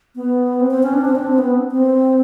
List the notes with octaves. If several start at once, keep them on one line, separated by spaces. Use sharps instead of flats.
B3
C4
C4
C#4
D4
C4
D4
C4
B3
C4